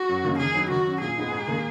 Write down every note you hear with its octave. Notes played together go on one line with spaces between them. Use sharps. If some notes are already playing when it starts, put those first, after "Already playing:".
Already playing: F#4
F#2
D#3 A#3 C#4
D#3 G#4
F#3 B3 D#4
D#3 F#4
F#3 C#4
A#2 G#4
G#3 B3 D#4
G#2
D#3 A#3 D#4